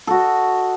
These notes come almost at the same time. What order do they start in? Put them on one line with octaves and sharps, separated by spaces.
A4 F#4 D#5